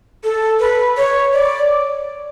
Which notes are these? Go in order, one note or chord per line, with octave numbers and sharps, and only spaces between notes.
A4
B4
C#5
D5